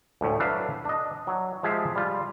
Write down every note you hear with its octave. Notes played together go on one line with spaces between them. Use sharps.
D2 A2
F#3 D4 B4 E5 F5
D4 D#5
F#3
F3 G#3 G4 G#4 E5 F5
G3 F4